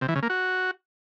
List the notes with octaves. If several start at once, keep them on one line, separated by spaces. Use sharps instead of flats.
C3
E3
C#3
A#3
F#4